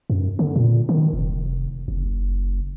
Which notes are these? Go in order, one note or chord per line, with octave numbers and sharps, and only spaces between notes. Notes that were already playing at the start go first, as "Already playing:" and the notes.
F#2
D3
A#2
D#3
F1
F#1